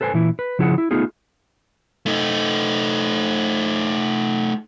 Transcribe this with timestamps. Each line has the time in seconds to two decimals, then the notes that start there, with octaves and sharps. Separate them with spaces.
0.01 A4 B4 C5 G5 G#5
0.14 A#2 E3 E4
0.39 B4
0.59 C#3 F3 E4 G#4 F#5
0.78 E4
0.91 A3 B3 D#4 F4 G#4
2.06 A3 D#4